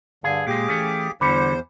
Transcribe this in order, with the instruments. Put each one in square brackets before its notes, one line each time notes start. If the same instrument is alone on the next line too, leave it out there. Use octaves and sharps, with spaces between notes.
[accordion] G2 D3 [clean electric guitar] G#4 [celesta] F5
[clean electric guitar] A#2 G#3 [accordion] G4 G#4 D6
[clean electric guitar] E3 A3 C#4
[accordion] E2 C5 [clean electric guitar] D3 G3 [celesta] B5 D6 C#7